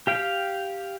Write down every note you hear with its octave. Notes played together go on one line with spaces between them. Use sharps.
G4 F5 G5